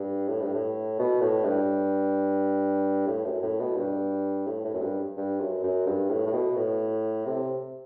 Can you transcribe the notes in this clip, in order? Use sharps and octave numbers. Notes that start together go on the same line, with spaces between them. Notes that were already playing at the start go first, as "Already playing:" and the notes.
Already playing: G2
A2
G2
A2
B2
A2
G2
A2
F#2
A2
B2
G2
A2
A2
F#2
G2
G2
F#2
F#2
G2
A2
A2
B2
A2
C3